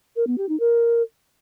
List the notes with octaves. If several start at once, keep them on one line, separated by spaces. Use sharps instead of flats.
A#4
B3
G4
D#4
A#4